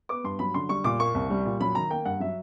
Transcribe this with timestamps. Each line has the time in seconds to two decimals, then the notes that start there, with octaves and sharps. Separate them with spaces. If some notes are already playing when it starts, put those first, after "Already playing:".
0.09 B3 D6
0.24 G2 C6
0.39 F#3 B5
0.54 D3 C6
0.69 G3 C#6
0.84 A#2 D6
0.99 A#3 C#6
1.14 C2
1.30 G3
1.45 A#2
1.60 F#3 B5
1.75 D#3 A#5
1.90 A#3 G5
2.05 G2 F#5
2.20 F#3 E5